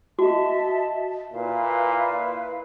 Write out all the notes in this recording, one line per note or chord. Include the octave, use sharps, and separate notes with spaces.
F#4 D#5 E5 A5
A#2 E4 B4 F5